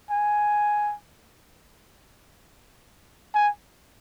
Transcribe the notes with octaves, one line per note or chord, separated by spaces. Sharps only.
G#5
G#5